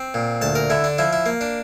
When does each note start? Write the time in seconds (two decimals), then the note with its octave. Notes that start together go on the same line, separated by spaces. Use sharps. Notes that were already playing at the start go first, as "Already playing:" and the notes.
Already playing: C4
0.14 A#2
0.42 D2 A5
0.55 A#4
0.70 D3 E4
0.84 D4
0.98 F3 E4
1.13 E4
1.26 A#3
1.41 D4